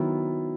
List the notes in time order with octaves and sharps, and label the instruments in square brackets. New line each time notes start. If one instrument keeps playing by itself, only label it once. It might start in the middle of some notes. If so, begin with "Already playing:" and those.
Already playing: [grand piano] D#3 F#3 B3 E4